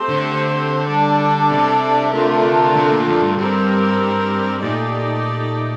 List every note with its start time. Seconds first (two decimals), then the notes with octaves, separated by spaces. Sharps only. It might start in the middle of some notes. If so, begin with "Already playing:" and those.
Already playing: A3 C4 G4 C5
0.09 D3
0.88 G3 D4 A4 D5
1.51 C3
2.13 D3 A3 D4 F4 A#4
2.76 C3
2.92 A#2
3.07 F2
3.23 G2
3.38 G2 G3 C4 G4 A#4
4.63 A#2 A3 D#4 G4 D5